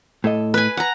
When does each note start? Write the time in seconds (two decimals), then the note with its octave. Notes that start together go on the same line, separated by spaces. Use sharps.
0.24 A2 A4 D#5
0.54 B4 G#5
0.77 F#5 A#5